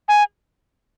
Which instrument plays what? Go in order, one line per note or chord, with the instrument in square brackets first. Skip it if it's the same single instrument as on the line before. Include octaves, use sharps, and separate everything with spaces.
[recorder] G#5